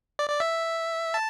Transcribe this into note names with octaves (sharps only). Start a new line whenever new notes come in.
D5
D5
E5
A5